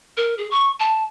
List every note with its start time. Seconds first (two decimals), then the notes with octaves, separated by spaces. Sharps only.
0.17 A#4
0.38 G#4
0.51 C#6
0.80 A5